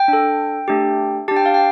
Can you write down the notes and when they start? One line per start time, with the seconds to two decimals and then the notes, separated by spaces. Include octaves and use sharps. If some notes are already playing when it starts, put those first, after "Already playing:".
Already playing: G5
0.08 D4 A4
0.68 A3 D4 G4
1.28 D4 G4 A5
1.36 G5
1.46 F5
1.54 G5